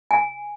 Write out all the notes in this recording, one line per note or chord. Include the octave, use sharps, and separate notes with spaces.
G#5